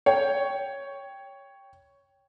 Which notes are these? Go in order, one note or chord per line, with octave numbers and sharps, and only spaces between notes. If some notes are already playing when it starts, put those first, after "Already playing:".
C#5 G5